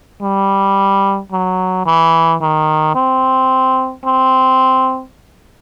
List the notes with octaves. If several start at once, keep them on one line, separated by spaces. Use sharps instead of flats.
G3
F#3
E3
D#3
C4
C4